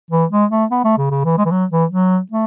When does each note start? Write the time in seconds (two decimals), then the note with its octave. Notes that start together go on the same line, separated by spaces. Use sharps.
0.11 E3
0.31 G#3
0.51 A3
0.71 B3
0.84 A3
0.98 C#3
1.11 C#3
1.25 E3
1.38 G#3
1.45 E3
1.51 F#3
1.71 E3
1.91 F#3
2.31 A3